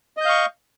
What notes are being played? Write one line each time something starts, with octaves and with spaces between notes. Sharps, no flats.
D#5 F5 C#6 G6